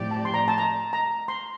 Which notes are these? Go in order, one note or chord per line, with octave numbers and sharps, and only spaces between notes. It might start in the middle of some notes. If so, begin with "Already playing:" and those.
Already playing: A2 F3 C4 G4 D5
A5
C6
A#5
A5
A#5
A#5
C6